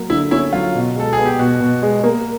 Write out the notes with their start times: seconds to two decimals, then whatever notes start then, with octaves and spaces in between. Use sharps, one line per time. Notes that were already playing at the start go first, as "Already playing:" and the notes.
Already playing: F#3 A#3
0.10 D3 E4
0.31 C#4 E4
0.53 F#3 F4
0.75 B2
0.96 G#3 A4
1.13 G#4
1.18 B3
1.26 G4
1.39 B2 F#4
1.60 B2
1.82 G#3
2.04 A#3